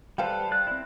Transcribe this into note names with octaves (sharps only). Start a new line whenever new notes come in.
G3 A4 B4 C5 F5 G5
D5 F#6
C4 E4